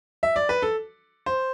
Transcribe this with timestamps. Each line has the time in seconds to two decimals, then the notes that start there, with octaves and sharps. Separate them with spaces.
0.23 E5
0.36 D5
0.49 B4
0.62 A4
1.26 C5